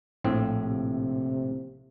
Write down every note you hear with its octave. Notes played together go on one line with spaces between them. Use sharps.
A#1 A2 C4
C3